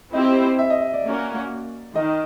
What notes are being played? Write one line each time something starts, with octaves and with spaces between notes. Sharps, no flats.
C4 E4 G4 C5 D#5
E5
D#5
D#5
D5
A#3 C#4 F#4 A#4
D#3 D#5